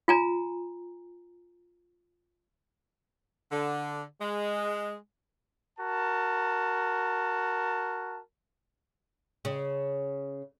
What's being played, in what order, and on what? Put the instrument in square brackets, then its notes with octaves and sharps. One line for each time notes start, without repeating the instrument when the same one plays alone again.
[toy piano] F4 G#5 A#5
[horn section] D3
G#3
[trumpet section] F#4 A#4 A5
[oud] C#3